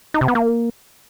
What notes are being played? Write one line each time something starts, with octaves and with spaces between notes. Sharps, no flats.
D#4
C3
B3
A#3